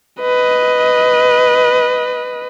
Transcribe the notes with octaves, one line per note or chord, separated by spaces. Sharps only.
B4 D#5